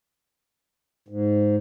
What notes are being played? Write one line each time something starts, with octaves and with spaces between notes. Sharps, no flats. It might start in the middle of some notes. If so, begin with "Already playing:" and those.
G#2